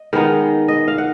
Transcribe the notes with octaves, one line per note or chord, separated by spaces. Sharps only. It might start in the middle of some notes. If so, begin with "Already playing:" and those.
Already playing: D#5
D#3 G#3 B3 D#4
D#5
F5
F#5